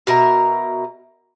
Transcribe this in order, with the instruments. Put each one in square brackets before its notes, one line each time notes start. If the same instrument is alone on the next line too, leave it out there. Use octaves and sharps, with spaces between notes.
[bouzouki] B2 A#4 E5 A#5